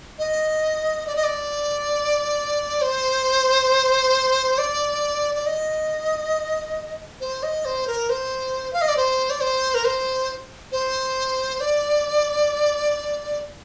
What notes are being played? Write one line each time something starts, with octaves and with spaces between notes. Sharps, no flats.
D#5
D5
D#5
D5
C5
D5
D5
D#5
C5
D#5
C5
A#4
C5
F5
D#5
D5
C5
D5
C5
A#4
C5
C5
D5